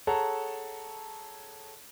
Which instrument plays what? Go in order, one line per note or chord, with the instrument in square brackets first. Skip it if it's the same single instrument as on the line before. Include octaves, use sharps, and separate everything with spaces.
[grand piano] G#4 A4 C#5 F#5 A5 A#5